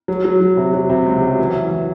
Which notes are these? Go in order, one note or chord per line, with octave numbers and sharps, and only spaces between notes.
F#3
F#3
F#3
C3
F#3
C3
C#2
F#3
E3
E3
E3